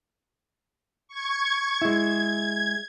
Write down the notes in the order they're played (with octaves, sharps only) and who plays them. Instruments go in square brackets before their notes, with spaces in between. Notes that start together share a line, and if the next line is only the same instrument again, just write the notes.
[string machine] C#6 G#6
[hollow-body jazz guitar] G#3 E4 [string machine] G#6